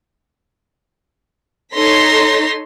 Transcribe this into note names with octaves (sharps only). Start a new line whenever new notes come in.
D#4 A4 C#5 C6 A#6 B6